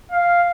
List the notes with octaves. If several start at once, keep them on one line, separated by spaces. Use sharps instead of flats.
F5